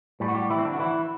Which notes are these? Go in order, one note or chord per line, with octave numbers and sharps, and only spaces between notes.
A2 G3
F#4
G3 G4
E3 E4
C4
D3 D4
F#4
E3 E4